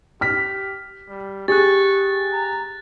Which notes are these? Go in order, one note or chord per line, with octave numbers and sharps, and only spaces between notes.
G4 F6 B6
G3
G4 G#4 C#6 F#6 A6
A#5